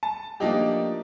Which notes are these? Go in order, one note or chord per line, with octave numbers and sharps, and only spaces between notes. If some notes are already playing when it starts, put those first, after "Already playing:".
A5
F3 A3 A#3 D4 D#4 G4